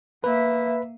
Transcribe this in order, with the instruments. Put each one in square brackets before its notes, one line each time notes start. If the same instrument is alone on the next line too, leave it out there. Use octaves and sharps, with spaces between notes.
[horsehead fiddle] A#3 E5 [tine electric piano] B4